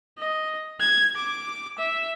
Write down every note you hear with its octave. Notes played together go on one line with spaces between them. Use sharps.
D#5
G#6
D6
E5